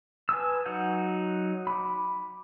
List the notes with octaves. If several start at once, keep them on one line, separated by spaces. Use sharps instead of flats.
B4 G#5 A5 D#6 E6
F#3 D#4 F#4 F#5 G6
B5 D6